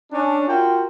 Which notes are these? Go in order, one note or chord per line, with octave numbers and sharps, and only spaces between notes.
C#4 D4
F4 F#4 A#4 G5